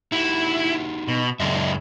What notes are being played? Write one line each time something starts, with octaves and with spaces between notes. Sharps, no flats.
D#4 E4 F#4 G4
B2
C#2 F#2 D4 D#5 E5